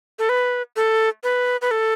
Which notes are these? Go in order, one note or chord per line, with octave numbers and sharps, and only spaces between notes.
A4
B4
A4
B4
B4
A4